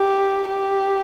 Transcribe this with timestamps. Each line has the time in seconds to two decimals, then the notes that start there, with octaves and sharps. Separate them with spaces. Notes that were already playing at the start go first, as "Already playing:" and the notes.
Already playing: G4
0.49 G4